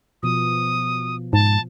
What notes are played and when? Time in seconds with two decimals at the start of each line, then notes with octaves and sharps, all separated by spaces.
0.23 B2 F3 B3 D#6
1.33 G#2 A5